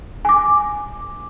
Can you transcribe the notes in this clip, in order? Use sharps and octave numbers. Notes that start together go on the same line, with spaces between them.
G#5 D6